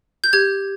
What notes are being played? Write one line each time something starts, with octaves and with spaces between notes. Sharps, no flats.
G6
G4 G#6